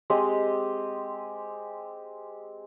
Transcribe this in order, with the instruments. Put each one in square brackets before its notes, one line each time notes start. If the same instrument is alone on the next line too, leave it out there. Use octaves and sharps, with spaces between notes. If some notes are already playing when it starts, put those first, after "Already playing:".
[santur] G#3 C4 G4 D#5